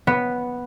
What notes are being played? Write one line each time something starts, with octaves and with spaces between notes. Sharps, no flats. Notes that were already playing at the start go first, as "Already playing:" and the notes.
B3